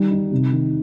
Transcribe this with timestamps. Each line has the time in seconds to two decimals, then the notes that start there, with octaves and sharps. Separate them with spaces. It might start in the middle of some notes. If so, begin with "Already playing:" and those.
Already playing: D#3 G3
0.11 D#4
0.32 C3
0.52 D#3